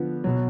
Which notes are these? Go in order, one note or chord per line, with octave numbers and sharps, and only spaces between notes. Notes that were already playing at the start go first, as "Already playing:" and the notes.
Already playing: D3 F3 B3
B2 F#3